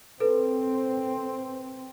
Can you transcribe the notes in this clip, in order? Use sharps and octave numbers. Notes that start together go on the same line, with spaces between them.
C4 A4 B4